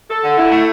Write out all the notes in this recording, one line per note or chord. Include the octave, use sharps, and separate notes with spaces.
A4
D3
E4
A3